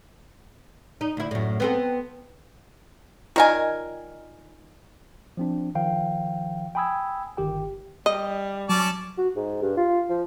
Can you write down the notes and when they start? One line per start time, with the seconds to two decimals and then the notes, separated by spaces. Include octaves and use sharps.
1.01 D#4
1.17 D2 E4
1.31 F#2 A2
1.60 B3 C4 A4
3.36 D#3 F4 A#4 D5 D#5 G#5
5.37 F3 C4 D4
5.75 D#3 F3 F5 G5
6.75 G5 G#5 B5 D#6 E6 G#6
7.37 G1 D#3 G4 G5
8.06 G3 D#5
8.69 F#3 C#4 D5 A5
9.18 F#4
9.36 G#2
9.62 G2
9.77 F4
10.10 F3